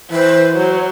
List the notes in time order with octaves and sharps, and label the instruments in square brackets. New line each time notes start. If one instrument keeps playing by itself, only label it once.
[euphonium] E3 [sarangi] B4 [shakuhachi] C5
[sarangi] F#3